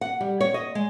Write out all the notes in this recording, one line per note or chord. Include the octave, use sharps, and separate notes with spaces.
F#5
G3
C#5
D#5
G#3